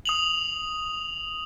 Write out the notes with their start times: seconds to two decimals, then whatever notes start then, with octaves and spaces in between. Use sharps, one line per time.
0.05 D#6 F7 F#7